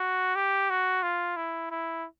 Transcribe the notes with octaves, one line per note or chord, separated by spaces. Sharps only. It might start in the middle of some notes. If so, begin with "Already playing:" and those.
Already playing: F#4
G4
F#4
F4
E4
E4